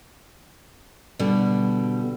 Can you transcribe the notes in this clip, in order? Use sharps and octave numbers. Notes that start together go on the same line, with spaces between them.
B2 D3 G3